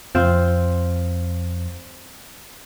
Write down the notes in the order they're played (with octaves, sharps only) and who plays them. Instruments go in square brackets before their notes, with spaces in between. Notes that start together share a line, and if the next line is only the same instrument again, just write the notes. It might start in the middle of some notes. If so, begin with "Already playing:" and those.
[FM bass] F2 [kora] C4 F4 C5